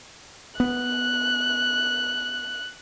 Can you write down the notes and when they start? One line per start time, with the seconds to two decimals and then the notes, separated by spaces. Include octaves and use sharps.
0.60 B3 F#6